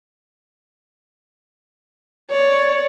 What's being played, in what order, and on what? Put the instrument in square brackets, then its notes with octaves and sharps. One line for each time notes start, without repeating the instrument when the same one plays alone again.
[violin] C#5 [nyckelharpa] D5